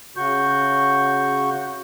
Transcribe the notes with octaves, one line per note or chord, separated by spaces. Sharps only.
C#3 F#4 C#6 G6